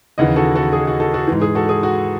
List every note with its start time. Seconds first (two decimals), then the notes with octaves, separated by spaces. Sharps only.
0.18 D#2 C#3 E3 D#5 F#5
0.36 F#4 A4
0.55 F#4 A4
0.73 G#4
0.87 F#4
1.00 F#4 A4
1.14 F#4 A4
1.27 G#2 E3
1.41 G#4
1.55 F#4 A4
1.69 G#4
1.83 F#4